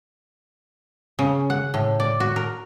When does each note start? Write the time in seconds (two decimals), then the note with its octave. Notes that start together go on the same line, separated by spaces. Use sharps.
1.19 C#3
1.50 F#5
1.74 A2
2.00 D5
2.20 F#4
2.36 A#4